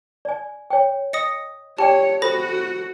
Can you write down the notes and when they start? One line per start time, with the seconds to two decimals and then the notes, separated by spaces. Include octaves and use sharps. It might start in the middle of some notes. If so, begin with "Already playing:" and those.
0.25 D5 G#5
0.70 C#5 G5
1.13 D#5 D#6 A#6 C#7
1.78 G4 C#5 D5 G5 A5
2.22 F#4 A4 C5 B5 A#6